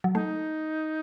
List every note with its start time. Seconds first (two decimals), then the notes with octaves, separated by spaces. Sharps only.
0.04 F#3
0.15 A3 D#4